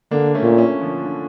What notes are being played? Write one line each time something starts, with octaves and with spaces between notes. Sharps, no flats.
D3 A#3 D4
A3 C#4
A#2
A3 C#4
D3 F3
D3 F3